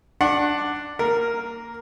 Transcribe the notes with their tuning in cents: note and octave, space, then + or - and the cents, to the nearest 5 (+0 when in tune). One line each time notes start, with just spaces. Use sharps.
D4 +0 F#5 +0 C#6 -45
A#3 -15 A#4 +0